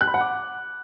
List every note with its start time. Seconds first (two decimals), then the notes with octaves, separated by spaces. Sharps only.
0.01 F#6
0.07 B5
0.14 F#5
0.21 D6